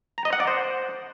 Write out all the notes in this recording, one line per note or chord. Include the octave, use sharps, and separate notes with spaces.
A#5
D#5
F#5
D5
C5